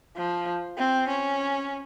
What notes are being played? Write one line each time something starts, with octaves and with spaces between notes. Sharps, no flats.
F3
C4
C#4